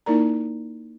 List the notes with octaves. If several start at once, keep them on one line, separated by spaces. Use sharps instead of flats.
A#3 D#4 E4 A#4 D5 A#5